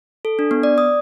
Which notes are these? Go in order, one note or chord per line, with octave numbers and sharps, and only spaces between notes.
A4
D4
B3
D5
D#6